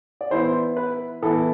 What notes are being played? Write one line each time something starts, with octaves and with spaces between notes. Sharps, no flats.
D5
E3 B3 E4 C5
B4
E3 B3 E4 A4